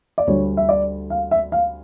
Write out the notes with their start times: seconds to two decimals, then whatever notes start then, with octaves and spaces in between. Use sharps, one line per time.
0.18 D5
0.27 D2 D3 G3 C#5
0.57 E5
0.69 D5
1.10 F5
1.31 E5
1.52 F5